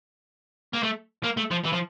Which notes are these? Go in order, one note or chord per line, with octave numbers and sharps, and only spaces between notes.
A#3
A3
A#3
A3
F3
E3
F3